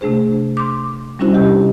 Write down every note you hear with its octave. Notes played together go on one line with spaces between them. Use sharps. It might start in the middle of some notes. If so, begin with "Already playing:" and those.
C3 A3 D4 G#4 C5
C6 D6
G3 C#4 D4 E4 F#4 C5
C3 G4 D#5